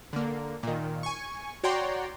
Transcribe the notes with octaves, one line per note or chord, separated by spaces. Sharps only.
D3 A#3
A#2 D#3
G#5 C#6
F#4 C#5 D5 G5 A#5 C6